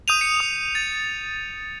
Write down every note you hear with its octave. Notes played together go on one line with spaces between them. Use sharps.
D#6 G6 D#7 F7
C#7
D#6
A6